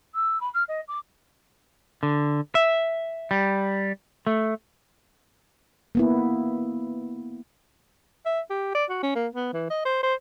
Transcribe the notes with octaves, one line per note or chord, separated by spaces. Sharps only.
E6
B5
F6
D#5
D6
D3
E5
G3
A3
A#3 B3 E4
E5
G4
D5
F#4
C#4
A#3
B3
E3
D#5
C5
C5